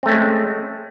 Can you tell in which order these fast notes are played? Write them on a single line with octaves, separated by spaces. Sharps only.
C4 A3 C#4 G#3